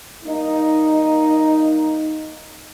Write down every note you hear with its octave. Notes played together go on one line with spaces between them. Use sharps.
G3 A#3 D#4